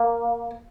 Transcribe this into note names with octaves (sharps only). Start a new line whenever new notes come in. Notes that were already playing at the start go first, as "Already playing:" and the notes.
Already playing: A#3